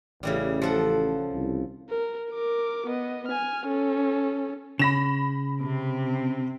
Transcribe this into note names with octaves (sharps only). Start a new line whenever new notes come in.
A1 C#3 E3 G3
F3 A4 F#5
C2
A#4
A#4 D6
B3 D#5
G#5 F6
C#4 A4
C#3 B5 A#6 E7
C3 C4